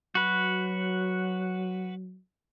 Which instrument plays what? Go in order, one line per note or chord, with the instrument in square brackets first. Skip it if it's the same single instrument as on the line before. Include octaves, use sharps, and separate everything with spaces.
[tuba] F#3 [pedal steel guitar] F#4 B4